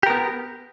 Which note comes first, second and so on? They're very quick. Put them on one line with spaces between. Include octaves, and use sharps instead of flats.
G4 A#4 B3